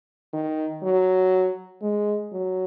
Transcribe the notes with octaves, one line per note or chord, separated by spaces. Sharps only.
D#3
F#3
G#3
F#3